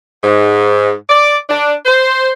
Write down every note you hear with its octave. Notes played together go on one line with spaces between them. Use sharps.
G#2
D5
D4
C5